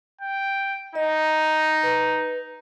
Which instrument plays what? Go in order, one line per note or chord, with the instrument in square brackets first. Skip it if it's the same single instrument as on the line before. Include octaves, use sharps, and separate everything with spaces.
[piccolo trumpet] G5
[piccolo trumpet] D#4 [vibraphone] D#5
[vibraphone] B4